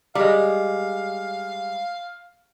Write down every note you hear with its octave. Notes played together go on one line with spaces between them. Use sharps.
G3 G#3 F5